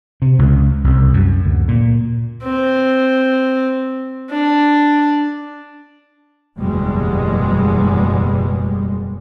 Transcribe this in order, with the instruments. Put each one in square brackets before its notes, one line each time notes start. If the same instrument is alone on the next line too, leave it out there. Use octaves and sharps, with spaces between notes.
[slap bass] C3
C#2
C2
F#2
D2
A#2
[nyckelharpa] C4
D4
[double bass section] F#1 E2 B2 G3 G#3